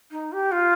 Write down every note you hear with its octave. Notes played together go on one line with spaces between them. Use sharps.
D#4
G4
F4